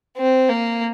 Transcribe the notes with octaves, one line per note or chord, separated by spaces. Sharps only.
C4
A#3